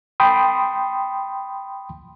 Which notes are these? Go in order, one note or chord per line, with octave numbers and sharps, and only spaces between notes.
G5 B5 C6 D#6